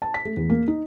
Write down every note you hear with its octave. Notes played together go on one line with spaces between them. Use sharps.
A5
B6
A3
E2
A#3
D#4